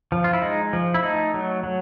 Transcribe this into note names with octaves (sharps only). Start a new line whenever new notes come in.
F3
F4
E4
G#3 D#4
F3
E4
A3 D#4
F#3
F#3